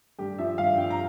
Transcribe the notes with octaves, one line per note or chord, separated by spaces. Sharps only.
G2 G4
F3 E5
G2 F5
F3 G5
A#5